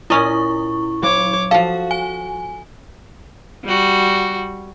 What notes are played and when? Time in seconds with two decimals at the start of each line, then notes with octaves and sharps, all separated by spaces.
0.10 A#2 C#4 E4 D#5 C#6
1.03 F#3 C#5 D6
1.51 F3 F#4 A4 F5
1.91 G#5
3.65 G3 F#4